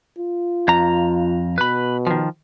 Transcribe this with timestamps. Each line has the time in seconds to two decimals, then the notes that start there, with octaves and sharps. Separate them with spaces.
0.18 F4
0.68 F2 A#5
1.58 B2 B4 B5
2.07 D#3 F3